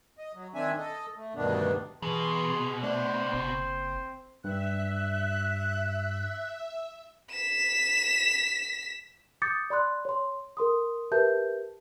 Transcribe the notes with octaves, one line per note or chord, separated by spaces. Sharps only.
D#5
F#3
D#3 C4 D4 E5 G#5
A4 D#5
A3
D2 G2 B2 D#3 B3 D4
B2 E3 G#4 C6
A3 D4 C5
F#1 C4
G2 E5 F#6
B6 E7
D6 D#6 G6 A6 C#7
D5 B5 C6 F#6
C#5 C6
A4 A#4 C6 D#6
G4 A#4 B4 E5 A5 G6